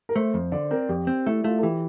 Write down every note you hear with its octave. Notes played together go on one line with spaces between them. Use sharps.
A#4
A3 C5
F2
D3 D5
C4 A#4
F2 G4
C4
A3 E4
A3 F4
A4
E3 G4